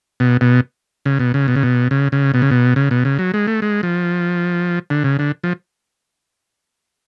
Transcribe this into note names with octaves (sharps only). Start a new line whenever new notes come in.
B2
B2
C#3
B2
C#3
B2
C#3
B2
C#3
C#3
B2
C#3
B2
C#3
B2
C#3
F#3
G#3
A3
G#3
F3
D3
C#3
D3
F3